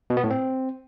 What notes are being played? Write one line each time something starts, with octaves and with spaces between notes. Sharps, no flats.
B2
B3
A2
C4